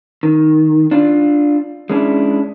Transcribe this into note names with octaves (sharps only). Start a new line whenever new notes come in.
D#3
D4 F4
G#3 C#4 D4 E4